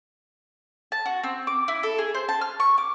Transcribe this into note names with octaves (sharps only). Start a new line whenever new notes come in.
A5
F#4
C4
D6
E4
A4
G#4
C5
A5
F6
C#6
D6